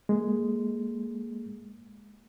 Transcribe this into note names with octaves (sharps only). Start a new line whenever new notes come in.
G#3 A#3